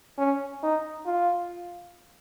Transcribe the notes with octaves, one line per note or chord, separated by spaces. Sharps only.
C#4
D#4
F4